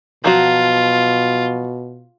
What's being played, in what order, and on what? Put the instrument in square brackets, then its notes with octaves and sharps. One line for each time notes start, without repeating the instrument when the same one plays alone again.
[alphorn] B2 [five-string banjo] F3 F#3 F#4 [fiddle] F4